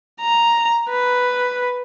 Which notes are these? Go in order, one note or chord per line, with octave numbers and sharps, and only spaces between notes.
A#5
B4